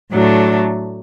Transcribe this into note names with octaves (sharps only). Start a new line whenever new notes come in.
A2 F#3 A3 D4